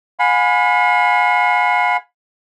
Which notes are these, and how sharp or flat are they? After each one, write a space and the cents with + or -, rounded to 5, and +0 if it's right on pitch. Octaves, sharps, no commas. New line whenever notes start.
F5 +45 G#5 +0 B5 +5